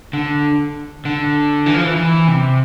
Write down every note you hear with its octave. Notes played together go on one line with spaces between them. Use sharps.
D3
D3
E3
F3
E3
E3
C3